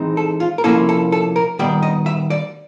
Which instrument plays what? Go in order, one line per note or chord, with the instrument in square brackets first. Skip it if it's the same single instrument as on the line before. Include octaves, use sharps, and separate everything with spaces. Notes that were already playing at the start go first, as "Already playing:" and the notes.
Already playing: [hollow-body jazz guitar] E3 G#3 C4 D#4
A4
F4
A#4
C3 F3 A#3 C#4 E4 A4
A4
A4
A#4
D#3 G3 B3 D5
D#5
E5
D5